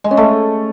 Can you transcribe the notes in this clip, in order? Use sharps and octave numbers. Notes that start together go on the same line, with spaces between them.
G#3
C#4
A3